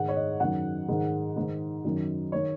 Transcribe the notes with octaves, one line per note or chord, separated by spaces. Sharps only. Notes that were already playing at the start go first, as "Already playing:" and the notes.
Already playing: G#2 D#3 F#5
C#5
D#5
F#2 D#3 F#5
G#2 D#3
G#2 D#3
F#2 D#3
D#3 C#5